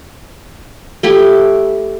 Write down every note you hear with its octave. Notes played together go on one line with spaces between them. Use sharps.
A3 E4 G4